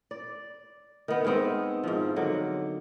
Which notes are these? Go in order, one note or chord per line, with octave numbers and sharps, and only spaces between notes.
D5
D#3 B3
D#3 G#3 B3 C4
G#2 F3
D3 D#3 F#3